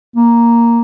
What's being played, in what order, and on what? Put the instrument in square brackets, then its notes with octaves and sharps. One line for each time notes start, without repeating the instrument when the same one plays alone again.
[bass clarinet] A#3